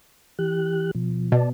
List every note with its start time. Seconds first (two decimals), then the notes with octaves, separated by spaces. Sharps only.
0.39 E3 G4 F#6
0.95 B2 F3
1.32 B2 D5 A5